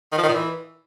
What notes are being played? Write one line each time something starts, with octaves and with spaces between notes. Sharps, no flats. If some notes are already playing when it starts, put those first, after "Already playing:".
D#3
F3
D#3
A#2
E3